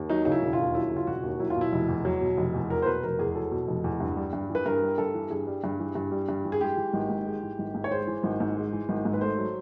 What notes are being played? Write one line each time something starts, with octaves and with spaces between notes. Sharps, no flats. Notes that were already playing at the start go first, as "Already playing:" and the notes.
Already playing: D#2
F#3 D#4
C#3 D#4
E4
E1
F4
D#2
F#3 E4
C#3
F4
E1 F#4
D#2
F#3 E4
F4
B2
E4
F1
E2
F#3
B2
F1
E2
F#3 A#4
C5
B2 B4
F1 A#4
E2 G#4
F#3 A4
B2
F1
E2
G2
G3
G2
E3
B4
G2 A#4
G3
G2 A4
E3
G2 G#4
G3
G2
E3
G2
G3
G2
E3
G#4
G#3 G4
E3
G#1
G#2
G#3
E3
G#1
G#2
C#5
G#3 C5
E3
G#1
G#2
G#3
E3
G#1
G#2
B4
A3 C5
F#3